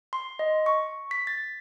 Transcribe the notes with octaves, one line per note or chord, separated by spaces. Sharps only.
C6
D#5
C#6
B6
A6